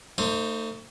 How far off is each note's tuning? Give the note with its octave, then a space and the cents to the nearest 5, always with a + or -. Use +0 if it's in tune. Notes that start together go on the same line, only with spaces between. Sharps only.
A3 +40 D#4 +0 C5 +0